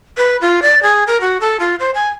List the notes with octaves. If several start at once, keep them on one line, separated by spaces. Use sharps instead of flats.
B4
F4
D5
G#4
A#4
F#4
A4
F4
C5
G#5